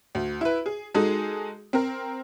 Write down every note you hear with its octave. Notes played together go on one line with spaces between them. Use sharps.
D2
E4 B4
G#4
G#3 D#4 F#4 G#4 A4
C4 A#4